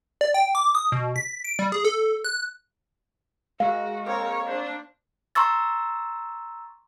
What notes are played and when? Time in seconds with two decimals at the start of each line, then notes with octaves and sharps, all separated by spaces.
0.21 D5
0.34 G5
0.55 D6
0.75 D#6
0.92 B2
1.16 B6
1.44 D7
1.59 G3
1.72 G#4
1.85 A4
2.25 F#6
3.60 G#3 F#4 A#4 F5 E6
4.06 A#3 C4 A#4 C#5
4.47 D4 A#4 C5
5.35 A#5 C6 C#6 E6 A6